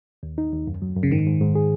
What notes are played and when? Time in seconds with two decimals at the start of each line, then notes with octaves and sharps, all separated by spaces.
0.23 D#2
0.38 D#4
0.52 D#2
0.67 F#2
0.82 F#3
0.96 F#2
1.03 C#3
1.11 G#2 D#3
1.26 G#2
1.41 G#2
1.55 G#4